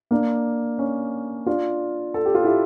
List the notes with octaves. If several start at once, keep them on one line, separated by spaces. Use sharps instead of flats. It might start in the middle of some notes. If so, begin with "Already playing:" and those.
A#3 D4
C#4
D4 F4
A4
G4
F4
E4 G4